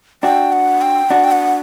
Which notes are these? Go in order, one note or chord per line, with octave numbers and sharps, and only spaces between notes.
D4 F#4 G5
F#5
G5
D4 F#4 F#5
G5
F#5